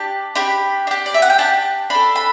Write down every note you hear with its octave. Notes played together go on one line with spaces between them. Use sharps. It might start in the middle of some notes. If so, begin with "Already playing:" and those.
Already playing: D4 G4 A5
D4 G4 B5
D4 G4
D5
E5
F#5
G5
D4 G4 A5
D4 A4 B5
B5